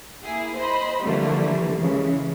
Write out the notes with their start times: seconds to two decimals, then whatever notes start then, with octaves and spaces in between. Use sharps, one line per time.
0.23 A#3 E4 G#4
0.57 C5 D#5 B5
1.03 D3 E3 F3 G3 A3 A#3
1.77 C#3 E3 G#3